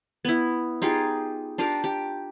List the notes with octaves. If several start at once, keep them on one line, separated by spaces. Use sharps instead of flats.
B3 E4
D#4 F4 G4 G#4
D4 F4 G4 A#4
G4